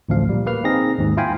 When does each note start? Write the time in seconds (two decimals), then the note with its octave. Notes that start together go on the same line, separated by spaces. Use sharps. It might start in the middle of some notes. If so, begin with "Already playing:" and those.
0.09 A1 D2 F3 F5
0.29 A#2 G3
0.46 A#3 B4 F5 F6
0.64 C4 D#4 G#4 A#6
0.98 D#2 G#2
1.17 E4 F4 F5 G5 G#5 B5